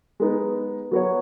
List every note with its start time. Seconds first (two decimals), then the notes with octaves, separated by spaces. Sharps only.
0.20 G#3 B3 D#4
0.91 F#3 B3 F#4 C#5